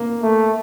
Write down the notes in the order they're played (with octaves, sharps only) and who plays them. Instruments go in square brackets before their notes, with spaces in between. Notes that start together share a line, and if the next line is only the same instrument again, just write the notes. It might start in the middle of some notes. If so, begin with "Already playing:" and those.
Already playing: [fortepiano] A#3
[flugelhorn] A3